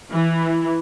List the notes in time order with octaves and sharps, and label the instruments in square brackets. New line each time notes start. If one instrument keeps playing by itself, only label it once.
[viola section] E3